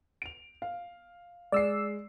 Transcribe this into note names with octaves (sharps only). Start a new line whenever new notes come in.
D7 F7
F5
G#3 D5 E6 C7